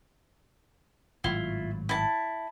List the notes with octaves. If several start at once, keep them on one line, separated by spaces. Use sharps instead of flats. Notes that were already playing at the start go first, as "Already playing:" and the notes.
G#1 A2 F#3 E4 F4
E4 A5